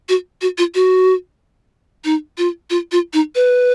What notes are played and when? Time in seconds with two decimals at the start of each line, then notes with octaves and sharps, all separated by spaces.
0.09 F#4
0.42 F#4
0.58 F4
0.75 F#4
2.05 D#4
2.38 F4
2.70 F4
2.92 F4
3.13 D#4
3.35 B4